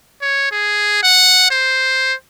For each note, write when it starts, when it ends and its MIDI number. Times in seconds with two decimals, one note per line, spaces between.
0.22 0.49 73
0.51 0.99 68
1.03 1.47 78
1.51 2.14 72